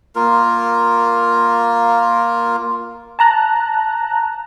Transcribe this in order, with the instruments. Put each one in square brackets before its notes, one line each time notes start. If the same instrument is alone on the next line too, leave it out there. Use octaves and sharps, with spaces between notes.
[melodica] A#3 F4 A#4
[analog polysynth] A5 A#5 F#6